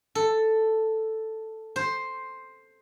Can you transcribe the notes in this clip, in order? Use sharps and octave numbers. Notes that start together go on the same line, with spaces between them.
A4
C5